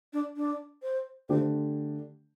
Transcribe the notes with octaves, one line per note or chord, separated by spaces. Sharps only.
D4
D4
C5
D3 A3 D4 G4 C5